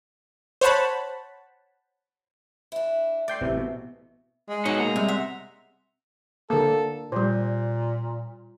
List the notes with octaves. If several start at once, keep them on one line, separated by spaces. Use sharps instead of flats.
C5 C#5 F#5 A5 B5
D4 E4
A3 D5 G5 C6
A1 C3 E3
B2
G#3
B2 F#3 D#4 F#4 C#5 C#7
A#3 A#5
C3 G3
E5 F#5 C6
D3 A#3 A4
A#2 G3 C5